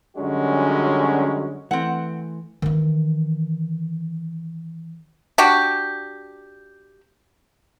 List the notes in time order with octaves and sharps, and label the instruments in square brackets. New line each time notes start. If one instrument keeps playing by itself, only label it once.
[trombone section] F#2 D3 G3 G#3 C#4 F#4
[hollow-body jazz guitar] E3 A3 [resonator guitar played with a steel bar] C4 F#5
[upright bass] D#3 E3
[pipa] D4 F#4 G4